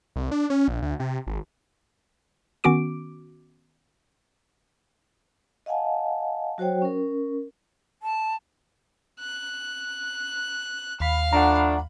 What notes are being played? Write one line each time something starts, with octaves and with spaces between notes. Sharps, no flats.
C2
D4
C#4
A#1
D2
C3
G#1
D#3 B3 C#4 F#4 D6 D7
D#5 F5 F#5 G#5 A5
F#3 F#4 C5 C#5 G5
C#4 A#4
A5
F#6
D#2 F5 B5
F3 A3 D4 F#5 A#5